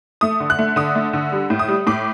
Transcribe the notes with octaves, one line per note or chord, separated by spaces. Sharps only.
A3 D#6
D3
F#6
A3
D3 D#6
A3
D3
G3
A2
D#6
G3
A2 D6